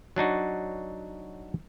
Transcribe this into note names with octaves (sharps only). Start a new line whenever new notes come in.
F#3 D4 D#4 F#4